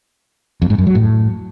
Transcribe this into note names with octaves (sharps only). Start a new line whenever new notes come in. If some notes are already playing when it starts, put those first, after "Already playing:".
F2
G#2
F#2
F#3
A2